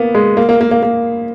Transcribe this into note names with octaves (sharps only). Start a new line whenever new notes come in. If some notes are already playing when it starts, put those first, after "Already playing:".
Already playing: A#3 B3
G#3
A#3
A#3
A#3
A#3
A#3